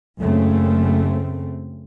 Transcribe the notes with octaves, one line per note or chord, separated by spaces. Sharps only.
F#1 F#2 C#3 A3 C4